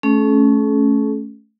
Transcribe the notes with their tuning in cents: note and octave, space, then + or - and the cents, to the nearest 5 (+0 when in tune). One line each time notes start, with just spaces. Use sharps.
A3 -15 C#4 +0 A4 -45